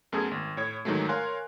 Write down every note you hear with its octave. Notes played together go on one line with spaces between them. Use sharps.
F#2 A3 B3 G#4 A4 G#6
G#1
A2 C#5 G#6
G#2 D#3 E3 F#3 G#3 A3
A#4 C#5 F5 G#5 C6 F#6